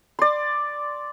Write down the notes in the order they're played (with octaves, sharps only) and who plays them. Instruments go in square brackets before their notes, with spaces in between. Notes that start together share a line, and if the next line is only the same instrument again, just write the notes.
[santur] D5 C6